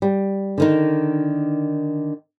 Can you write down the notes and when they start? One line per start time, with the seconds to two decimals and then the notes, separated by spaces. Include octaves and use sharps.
0.02 G3
0.58 D3 D#3 D#4